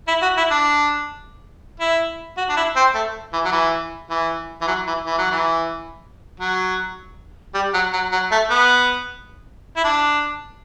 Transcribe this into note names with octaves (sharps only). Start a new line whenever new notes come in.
E4
F#4
E4
D4
E4
F#4
D4
E4
C4
A3
E3
F#3
E3
E3
E3
F#3
E3
E3
F#3
E3
F#3
G3
F#3
F#3
F#3
A3
B3
E4
D4